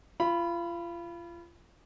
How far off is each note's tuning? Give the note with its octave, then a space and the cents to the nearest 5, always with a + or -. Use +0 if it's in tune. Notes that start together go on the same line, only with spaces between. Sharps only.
F4 -30 B5 +0